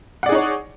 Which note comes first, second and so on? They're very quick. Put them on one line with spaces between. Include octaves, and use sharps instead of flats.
F#5 D5 G#4 D#4 C#5